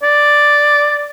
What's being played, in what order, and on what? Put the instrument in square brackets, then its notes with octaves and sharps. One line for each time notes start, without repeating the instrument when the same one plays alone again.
[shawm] D5